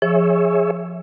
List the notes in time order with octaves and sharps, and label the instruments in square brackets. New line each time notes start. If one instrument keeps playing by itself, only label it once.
[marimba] F3 [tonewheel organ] G#4 C#5 E5